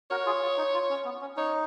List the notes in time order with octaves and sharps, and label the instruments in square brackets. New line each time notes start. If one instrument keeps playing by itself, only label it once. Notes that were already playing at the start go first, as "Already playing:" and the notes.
[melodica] F#4 A#4 [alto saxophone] C#5
[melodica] F4 G#4
F4
D#4
F4
C#4
B3
C#4
[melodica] D#4 [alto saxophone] C#5